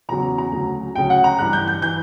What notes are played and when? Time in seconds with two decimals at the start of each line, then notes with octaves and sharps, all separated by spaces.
0.09 E2 C#3 F#3 A#5
0.38 A#5
0.52 D2 C#3 F#3
0.95 D2 C#3 F#3 G5
1.10 F#5
1.24 A#5
1.39 G2 E3 F#6
1.53 G6
1.68 G6
1.82 E3 G6